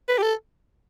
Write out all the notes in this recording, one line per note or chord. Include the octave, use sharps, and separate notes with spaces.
B4
G4
A4